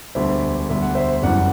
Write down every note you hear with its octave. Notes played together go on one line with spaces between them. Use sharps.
E1 D2 D3 G3 C5 E5
E1 D2 D3 G3 E5
F#5
C5 E5
F#1 F#2 E3 G3 D5 F#5